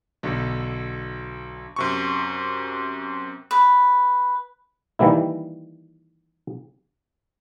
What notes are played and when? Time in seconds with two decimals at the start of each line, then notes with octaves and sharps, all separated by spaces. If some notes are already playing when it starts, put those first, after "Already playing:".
0.23 B1 D3
1.76 F#2 C3 C#6
3.51 B4
4.99 D#3 E3 G3 A#3 E4